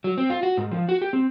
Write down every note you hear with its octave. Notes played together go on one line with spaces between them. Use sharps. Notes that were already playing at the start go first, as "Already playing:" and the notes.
F#3
C4
F4
F#4
G#2
F3
F#4
G4
C4